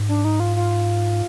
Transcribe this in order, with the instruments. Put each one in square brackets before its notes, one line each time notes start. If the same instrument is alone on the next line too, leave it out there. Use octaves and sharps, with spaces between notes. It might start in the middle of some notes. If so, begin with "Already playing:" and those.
Already playing: [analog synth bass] G#2
[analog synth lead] D4
D#4
F4
F4